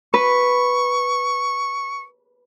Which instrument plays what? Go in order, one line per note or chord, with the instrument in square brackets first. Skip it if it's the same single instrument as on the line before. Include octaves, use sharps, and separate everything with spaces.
[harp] B4 [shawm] C#6